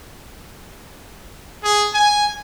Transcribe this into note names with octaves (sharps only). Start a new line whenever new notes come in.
G#4
G#5